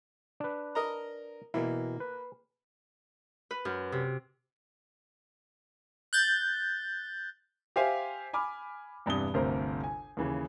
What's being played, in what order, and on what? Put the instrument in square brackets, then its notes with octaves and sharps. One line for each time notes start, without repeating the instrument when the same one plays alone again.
[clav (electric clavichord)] D4 B4
[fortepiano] A#4 D#5 A#5
[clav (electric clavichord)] B2 E3 E4 [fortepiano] A#3
[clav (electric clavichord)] B4
[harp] B4
F#2
C3
[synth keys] F#6 G6 A6
[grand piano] G4 C5 E5 F5 G#5
G#5 B5 D6 F6
E2 G2 C3 D#6 G7
G1 D2 C3 A#4 C5
G#5
D#2 C#3 E3